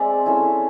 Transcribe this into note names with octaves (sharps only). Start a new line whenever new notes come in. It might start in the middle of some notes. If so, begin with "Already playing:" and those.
Already playing: G#3 C4 D5 E5
A3 C#4 E4